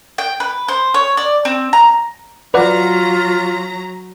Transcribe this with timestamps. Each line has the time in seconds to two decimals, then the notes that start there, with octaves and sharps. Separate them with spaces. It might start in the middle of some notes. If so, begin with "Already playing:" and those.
0.18 G5
0.40 B4
0.68 C5
0.94 C#5
1.17 D5
1.45 C4
1.73 A#5
2.54 F#3 F4 B4 D5 F#5 A#5 A#6